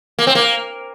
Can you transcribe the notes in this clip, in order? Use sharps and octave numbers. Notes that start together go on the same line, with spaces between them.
A#3
C4
A#3